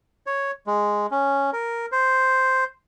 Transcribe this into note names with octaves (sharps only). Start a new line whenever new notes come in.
C#5
G#3
C#4
A#4
C5